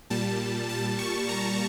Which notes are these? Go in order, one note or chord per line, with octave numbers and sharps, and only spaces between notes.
A#2 G3 A5
A5
C#6
A#5